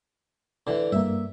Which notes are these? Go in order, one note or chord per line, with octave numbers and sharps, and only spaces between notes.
D3 E3
G2 A#3 E5